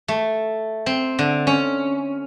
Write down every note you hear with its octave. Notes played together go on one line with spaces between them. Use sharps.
A3
C4
D3
C#4